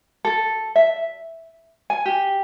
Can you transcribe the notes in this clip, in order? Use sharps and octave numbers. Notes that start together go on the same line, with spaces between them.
A4
E5
G#5
G4